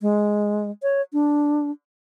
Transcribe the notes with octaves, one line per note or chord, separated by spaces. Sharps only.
G#3
C#5
D4